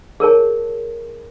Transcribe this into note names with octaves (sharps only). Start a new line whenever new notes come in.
G#4 A#4 C#5 A5